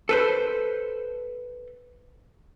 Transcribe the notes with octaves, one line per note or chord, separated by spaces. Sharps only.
A4 B4 C5